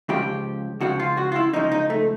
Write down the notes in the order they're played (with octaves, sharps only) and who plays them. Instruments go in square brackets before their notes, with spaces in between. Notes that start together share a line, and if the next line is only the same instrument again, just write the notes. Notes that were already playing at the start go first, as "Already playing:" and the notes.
[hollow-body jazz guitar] C#2 C#3 F3 G4
C#2 C#3 F3 F#4
F4
F#4
F4
E4
C#2 C#3 F3 D#4
D#4
A3